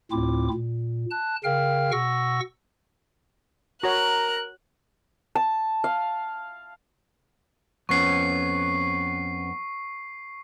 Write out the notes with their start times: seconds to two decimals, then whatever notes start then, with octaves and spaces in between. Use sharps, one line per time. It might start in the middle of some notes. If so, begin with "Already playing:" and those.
0.12 D2 A2 C4 E4 F4 D6
0.54 A#2
1.11 A5 F#6
1.44 C#3 A#4 F5 G5 F6
1.92 B2 F#5 C#6 E6 A#6
3.83 F#4 A#4 C#5 A#5 F#6
5.35 A5
5.84 F5
7.89 F2 B3 C#4 C#6 C7